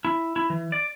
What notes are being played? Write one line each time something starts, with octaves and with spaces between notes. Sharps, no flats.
E4
E4
E3
D5